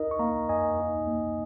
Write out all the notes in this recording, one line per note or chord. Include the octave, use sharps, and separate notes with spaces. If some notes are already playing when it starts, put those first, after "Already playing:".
Already playing: D#4 A#4 D#5
C#6
A#3 F5 A#5
F2 D#5 G#5
D#4
A#3